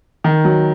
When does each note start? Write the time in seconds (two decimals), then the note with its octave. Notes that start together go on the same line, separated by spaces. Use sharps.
0.24 D#3
0.45 F#3